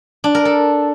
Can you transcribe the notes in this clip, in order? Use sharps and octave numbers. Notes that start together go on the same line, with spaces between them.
D4
A#4
A4